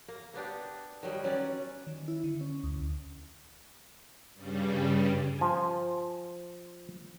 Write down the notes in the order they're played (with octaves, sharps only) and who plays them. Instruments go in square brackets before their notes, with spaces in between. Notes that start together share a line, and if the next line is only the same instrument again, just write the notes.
[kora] A#3
A#3 B3 D4 G4
D#3 F#3 G3
F#3 C#4 B4 D5
[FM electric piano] D#3
E4
D3
C#4
D2
[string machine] G2 C#3 G3
[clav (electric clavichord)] F3 G#5